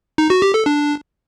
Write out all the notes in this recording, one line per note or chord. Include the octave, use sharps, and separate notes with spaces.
D#4
F#4
G4
A4
D4